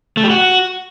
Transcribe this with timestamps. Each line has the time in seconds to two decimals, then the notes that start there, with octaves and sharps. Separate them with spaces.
0.17 A3
0.24 G4
0.30 F#4